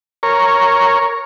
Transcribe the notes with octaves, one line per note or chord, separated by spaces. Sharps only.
A#4 C#5